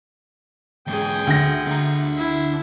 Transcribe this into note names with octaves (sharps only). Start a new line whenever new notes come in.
E2 G#2 G#4 G5
D2 A#6
D4 A#5
E4